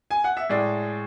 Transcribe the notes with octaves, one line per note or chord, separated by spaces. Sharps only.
G#5
F#5
E5
A2 G#3 D5